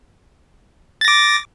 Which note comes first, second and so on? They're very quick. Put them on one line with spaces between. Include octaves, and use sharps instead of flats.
A6 A#6 D6